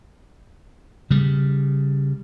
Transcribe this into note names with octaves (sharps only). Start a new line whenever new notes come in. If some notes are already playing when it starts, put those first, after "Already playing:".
C#3 G3